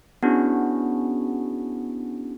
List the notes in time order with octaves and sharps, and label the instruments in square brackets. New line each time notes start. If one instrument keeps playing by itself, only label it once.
[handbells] B3 C#4 D4 E4 F#4 G#4